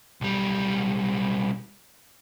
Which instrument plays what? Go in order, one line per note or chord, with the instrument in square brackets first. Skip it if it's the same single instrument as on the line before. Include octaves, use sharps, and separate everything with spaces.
[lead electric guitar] B1 G3